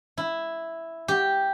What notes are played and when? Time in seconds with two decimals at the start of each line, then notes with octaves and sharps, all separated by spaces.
0.17 E4
1.08 G4